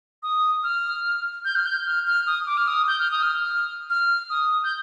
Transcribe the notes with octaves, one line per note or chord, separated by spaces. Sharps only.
D#6
F6
G6
F6
G6
F6
F6
D#6
D6
F6
D#6
G6
F6
D#6
F6
F6
D#6
G6